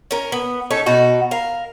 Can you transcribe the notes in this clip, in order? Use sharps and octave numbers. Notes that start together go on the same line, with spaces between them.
C#4 A#4
B3
C#4 D#4 A4 C#5
B2 D#4 F#4
A#4 F5